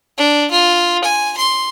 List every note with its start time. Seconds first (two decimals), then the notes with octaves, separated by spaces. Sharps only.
0.18 D4
0.51 F4
1.04 G#5
1.37 C6